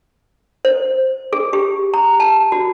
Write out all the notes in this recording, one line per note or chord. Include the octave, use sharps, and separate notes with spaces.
C5
G#4
G4
A#5
A5
F#4